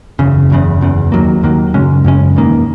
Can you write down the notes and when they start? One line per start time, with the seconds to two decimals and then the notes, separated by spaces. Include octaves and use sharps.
0.19 F#1 E2 C#3
0.50 F#1 E2 C#3
0.81 F#1 E2 C#3
1.12 D#2 D#3 F#3 A#3
1.43 D#2 D#3 F#3 A#3
1.74 F#2 C#3 G#3 C#4
2.04 F#2 C#3 G#3 C#4
2.36 E1 E2 D#3 A#3